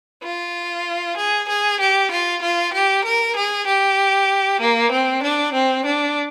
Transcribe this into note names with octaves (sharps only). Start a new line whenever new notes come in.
F4
G#4
G#4
G4
F4
F4
G4
A#4
G#4
G4
A#3
C4
D4
C4
D4